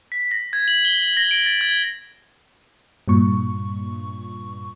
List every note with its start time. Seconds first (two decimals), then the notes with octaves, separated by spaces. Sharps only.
0.12 B6
0.31 A#6
0.53 G#6
0.68 F#7
0.85 G7
1.02 F#7
1.17 A#6
1.31 D7
1.46 A6
1.61 G#6
3.08 G2 A#2 C#6